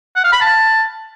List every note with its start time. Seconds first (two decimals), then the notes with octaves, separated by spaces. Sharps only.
0.16 F#5
0.24 F5
0.33 B5
0.41 A5